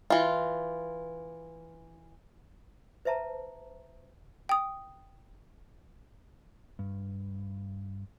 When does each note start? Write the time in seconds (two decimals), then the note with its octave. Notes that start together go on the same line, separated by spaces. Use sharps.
0.10 E3 F4
3.05 B4 C5 E5 A5 A#5
4.49 G5 D#6
6.79 G2